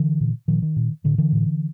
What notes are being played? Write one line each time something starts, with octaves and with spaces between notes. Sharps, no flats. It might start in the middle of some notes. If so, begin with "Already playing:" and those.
Already playing: D3 E3
A#2
A#2 D#3 F3
D#3
A#2
A2 D3
D3 E3
A2